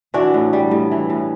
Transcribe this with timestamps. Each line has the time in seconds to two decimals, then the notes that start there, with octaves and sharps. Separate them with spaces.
0.14 E3 D4 F#4
0.34 A2
0.53 G3
0.71 A2
0.91 E3
1.10 A2